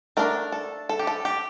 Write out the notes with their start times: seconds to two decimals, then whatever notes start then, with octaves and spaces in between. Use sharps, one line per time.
0.17 A3 D4 A#4
0.52 A4
0.89 A4
0.99 G4
1.07 A4
1.25 G4